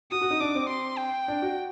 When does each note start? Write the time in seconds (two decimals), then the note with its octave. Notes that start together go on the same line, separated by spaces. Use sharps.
0.11 F#4 D#6
0.21 F#4
0.31 D#4
0.40 D4 D6
0.55 C4
0.69 C6
0.98 G5
1.28 D4
1.42 F#4